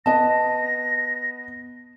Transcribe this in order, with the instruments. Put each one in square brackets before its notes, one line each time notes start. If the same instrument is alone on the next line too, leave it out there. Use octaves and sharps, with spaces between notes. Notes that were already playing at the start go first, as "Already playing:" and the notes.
[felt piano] B3 D#5 [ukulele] A5 [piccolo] A#6